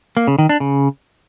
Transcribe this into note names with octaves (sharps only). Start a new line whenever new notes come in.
A#3
C#3
D#3
D4
C#3